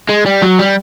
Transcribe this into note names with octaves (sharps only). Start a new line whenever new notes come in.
G#3
G3
F#3
G3